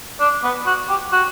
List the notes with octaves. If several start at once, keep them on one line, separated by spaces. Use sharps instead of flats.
D4
B3
F#4
G4
F#4